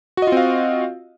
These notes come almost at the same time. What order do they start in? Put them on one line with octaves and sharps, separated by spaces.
F#4 D#5 F4 C4 F5